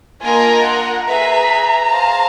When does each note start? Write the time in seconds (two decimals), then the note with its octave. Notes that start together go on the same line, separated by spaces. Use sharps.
0.22 A#3 D4 F4 A#4 D#5 G#5
0.64 F#5
1.05 G#4 B4 E5 A#5
1.87 G#4 C5 F5 A5